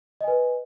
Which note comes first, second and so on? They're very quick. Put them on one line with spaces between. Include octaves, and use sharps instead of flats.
D#5 G#5 B4